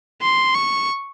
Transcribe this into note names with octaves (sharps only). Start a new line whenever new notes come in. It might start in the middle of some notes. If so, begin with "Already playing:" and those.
C6
C#6